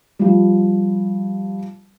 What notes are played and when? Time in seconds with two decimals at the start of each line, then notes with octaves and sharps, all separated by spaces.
0.19 F3 G3